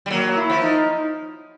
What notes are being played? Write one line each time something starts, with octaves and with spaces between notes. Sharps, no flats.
G3
F#3 A#3
E4
F3
D#4